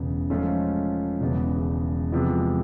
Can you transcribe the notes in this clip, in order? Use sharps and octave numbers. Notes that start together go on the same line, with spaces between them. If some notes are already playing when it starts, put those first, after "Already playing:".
Already playing: E1 E2 C#3
G#2 F3 A3 C#4 F4
E1 E2 C#3
E2 C3 F3 G#3